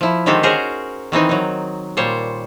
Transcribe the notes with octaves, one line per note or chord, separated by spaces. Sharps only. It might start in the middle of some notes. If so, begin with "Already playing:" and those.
F3 E4
D3 D#3 G#3 C4 G4 A4
C#4 F#4 G#4 A#4 C5 A#5
D#3 E3 C4 D#4
F#3 D#4
A#2 G3 C5 C#5